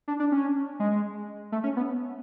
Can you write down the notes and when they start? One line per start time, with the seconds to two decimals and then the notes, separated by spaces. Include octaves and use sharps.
0.08 D4
0.20 D4
0.32 C#4
0.80 G#3
1.52 A3
1.64 C#4
1.77 B3